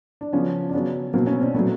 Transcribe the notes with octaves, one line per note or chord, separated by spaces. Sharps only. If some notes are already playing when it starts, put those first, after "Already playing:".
D4
C#3 F3 B3 C#4
D4
C#3 F#3 B3 C#4
B2 F#3 A#3 C4
B3 C#4
C4 D4
A#2 F#3 A3 B3